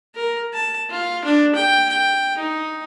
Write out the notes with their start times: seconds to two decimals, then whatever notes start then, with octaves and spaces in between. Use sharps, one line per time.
0.16 A#4
0.54 A5
0.90 F4
1.25 D4
1.56 G5
1.90 G5
2.38 D#4